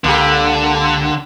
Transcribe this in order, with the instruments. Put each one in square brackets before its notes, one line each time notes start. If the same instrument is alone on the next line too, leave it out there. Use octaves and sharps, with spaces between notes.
[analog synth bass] C#2 [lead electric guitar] D3 [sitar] A#3 G4